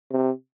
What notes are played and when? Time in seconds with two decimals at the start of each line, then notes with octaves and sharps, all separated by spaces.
0.11 C3